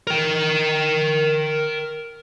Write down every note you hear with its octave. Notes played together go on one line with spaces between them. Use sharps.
A#4 G5